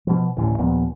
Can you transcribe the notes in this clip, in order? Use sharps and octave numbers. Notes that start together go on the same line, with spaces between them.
B2 F3
A1 D2 A2
D#2 A#2 F3 B3